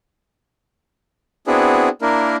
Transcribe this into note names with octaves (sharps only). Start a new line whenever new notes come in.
B3 C4 D4 E4 F#4 G#4
A#3 D4 E4 A#4